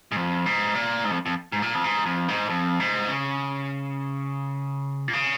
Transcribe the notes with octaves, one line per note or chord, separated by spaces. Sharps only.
G#2
F2
G#2
A#2
G#2
F2
F2
G#2
A#2
F2
G#2
F2
G#2
F2
G#2
C#3
A#2
C#3